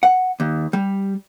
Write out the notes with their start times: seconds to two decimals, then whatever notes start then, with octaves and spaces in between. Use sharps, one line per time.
0.03 F#5
0.40 D#2
0.73 G3